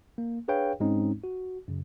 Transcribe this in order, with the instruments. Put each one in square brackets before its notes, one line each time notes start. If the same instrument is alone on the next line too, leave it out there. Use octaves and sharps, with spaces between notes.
[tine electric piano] A#3
D4 G#4 B4 C#5 F5 G5
G#2 G#3 C4 C#4 D#4
F#4
F#2 C#3